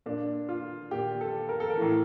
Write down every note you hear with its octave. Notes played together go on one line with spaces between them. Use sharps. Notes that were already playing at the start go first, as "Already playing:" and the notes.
A#2 D4
F4
A#2 G4
A4
A#4
A4
A#4
A2 E3